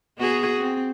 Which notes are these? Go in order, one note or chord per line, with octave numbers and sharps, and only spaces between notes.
B3 F#4 G#4
C4